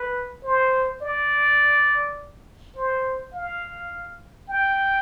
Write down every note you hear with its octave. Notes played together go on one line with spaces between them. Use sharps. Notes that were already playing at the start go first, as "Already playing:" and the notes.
Already playing: B4
C5
D5
C5
F5
G5